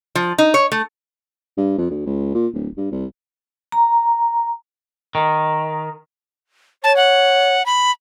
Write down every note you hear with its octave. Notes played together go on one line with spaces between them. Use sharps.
F3
D#4
C#5
A3
G2
F2
D2
C#2
A#2
D1
G2
C2
A#5
D#3
C#5 A5
F#5
B5